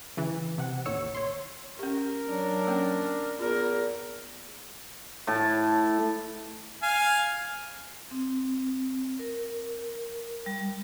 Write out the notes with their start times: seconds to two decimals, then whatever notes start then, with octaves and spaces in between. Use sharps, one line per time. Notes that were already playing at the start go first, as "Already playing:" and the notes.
0.17 C#3 E3
0.58 C3 F#5
0.85 A1 D#2 C#5 E6 C#7
1.15 C#5 C6
1.79 C#4 G4 A#4
2.29 F#3 D4
2.67 A#3 C#4 G5
3.39 E2 F4 A#4
5.27 A2 A5
6.83 F5 G#5
8.11 C4
9.19 A#4
10.46 G3